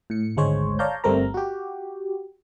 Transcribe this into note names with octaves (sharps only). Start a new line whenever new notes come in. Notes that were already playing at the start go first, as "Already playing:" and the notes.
A2 C#7
G#1 D2 G#3 C5 C#5
C#5 D5 F5 A5 A#5 G6
G1 G3 A3 C4 A#4 A#5
F#4 G4